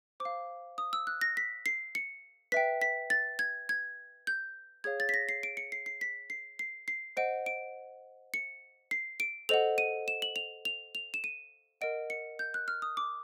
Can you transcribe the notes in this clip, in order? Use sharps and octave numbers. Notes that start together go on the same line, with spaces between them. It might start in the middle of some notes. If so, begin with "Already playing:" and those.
C5 D6
F5
D#6
E6
F#6
A#6
B6
C7
C#7
B4 E5 G5 B6
B6
A6
G#6
G#6
G6
G#4 C#5 F5 G#6
A6
B6
A#6
C7
D7
C#7
C7
C7
B6
C7
C7
C7
C5 D#5 F#5 D7
D7
C#7
C7
D7
A4 C5 D#5 F#5 F7
D#7
E7
F#7
F7
F7
F7
E7
D#7
A#4 D#5 F#5 D7
C#7
G6
F#6
F6
D#6
D6